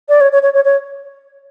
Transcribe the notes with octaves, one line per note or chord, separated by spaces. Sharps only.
D5
C#5
C#5
C#5
C#5
C#5